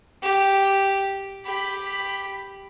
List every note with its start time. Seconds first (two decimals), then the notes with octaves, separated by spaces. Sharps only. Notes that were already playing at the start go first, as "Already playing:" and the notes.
0.22 G4
1.45 G4 B5